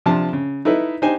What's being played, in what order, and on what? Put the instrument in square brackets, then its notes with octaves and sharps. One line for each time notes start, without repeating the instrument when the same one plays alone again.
[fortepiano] C3 F3 D4 A5
C#3
D#4 E4 A4 B4
D4 D#4 G4 C5 G#5